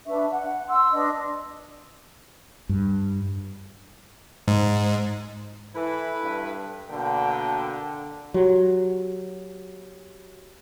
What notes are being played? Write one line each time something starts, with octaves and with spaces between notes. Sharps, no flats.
D4 B4 E5 C#6
F#5
C6 E6
D4 B4 D#5
G2
G#2
E3 E4 A4 B4
G2
B2 D3 A#3 G5
F#3 F#4 G4 C#5